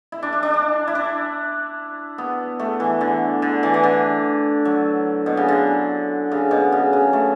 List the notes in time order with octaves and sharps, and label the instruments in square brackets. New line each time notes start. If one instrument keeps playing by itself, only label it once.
[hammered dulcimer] E4
D4
D4
D4
D4
E4
D4
B3
A3
E3
D3
D3
E3
E3
D3
F#3
B2
C#3
D3
C#3
B2
C#3
C#3
A3